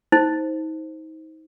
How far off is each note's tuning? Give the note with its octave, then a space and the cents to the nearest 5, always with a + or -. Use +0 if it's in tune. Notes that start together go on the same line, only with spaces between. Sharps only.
D#4 +35 C5 +0